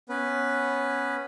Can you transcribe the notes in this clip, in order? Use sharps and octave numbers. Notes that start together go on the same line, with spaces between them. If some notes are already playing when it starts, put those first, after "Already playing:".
B3 C#4 B4